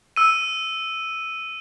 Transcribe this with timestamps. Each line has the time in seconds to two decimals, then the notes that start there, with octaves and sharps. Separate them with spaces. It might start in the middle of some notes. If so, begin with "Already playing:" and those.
0.16 E6 D#7